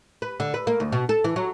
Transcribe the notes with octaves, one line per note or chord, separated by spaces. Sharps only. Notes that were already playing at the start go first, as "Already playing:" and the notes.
B4
D3
B4
A#3
D2
B2
A4
E3
F#3